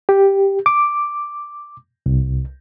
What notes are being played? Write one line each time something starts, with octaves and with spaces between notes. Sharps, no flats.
G4
D6
C2